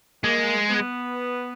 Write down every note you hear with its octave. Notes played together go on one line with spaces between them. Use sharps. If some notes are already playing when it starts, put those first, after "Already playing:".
G#3 A#3
B3